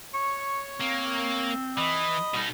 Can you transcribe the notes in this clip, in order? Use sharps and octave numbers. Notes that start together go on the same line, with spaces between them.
C#5 C#6
A#3 C4
E3 D#5 B5
B2 G3 D#4